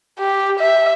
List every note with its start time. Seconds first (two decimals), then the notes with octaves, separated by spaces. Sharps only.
0.19 G4
0.59 E5